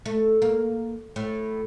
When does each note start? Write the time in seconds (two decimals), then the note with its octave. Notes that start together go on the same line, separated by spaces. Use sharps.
0.06 A3
0.42 A#3
1.16 A2